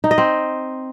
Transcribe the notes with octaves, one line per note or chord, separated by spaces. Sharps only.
D#4
D#5
C4